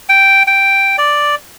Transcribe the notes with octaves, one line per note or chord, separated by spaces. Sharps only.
G5
G5
D5